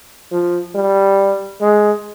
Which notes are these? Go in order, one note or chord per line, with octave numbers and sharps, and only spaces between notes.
F3
G3
G#3